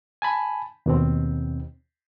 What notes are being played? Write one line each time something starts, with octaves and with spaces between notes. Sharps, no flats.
G#5 A5 B5
D#2 B2 C4